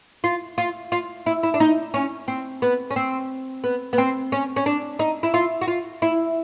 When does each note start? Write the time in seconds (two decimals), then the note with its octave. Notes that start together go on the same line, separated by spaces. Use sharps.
0.24 F4
0.58 F4
0.92 F4
1.26 E4
1.43 E4
1.54 D4
1.60 D#4
1.94 C#4
2.28 C4
2.62 B3
2.91 C#4
2.96 C4
3.64 B3
3.93 B3
3.98 C4
4.32 C#4
4.56 C#4
4.66 D4
4.99 D#4
5.23 E4
5.34 F4
5.61 F#4
5.67 F4
6.02 E4